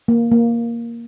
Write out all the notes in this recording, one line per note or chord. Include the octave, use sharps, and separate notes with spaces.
A#3
A#3